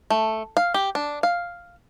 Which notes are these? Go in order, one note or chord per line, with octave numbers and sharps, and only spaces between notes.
A3
F5
G4
D4
F5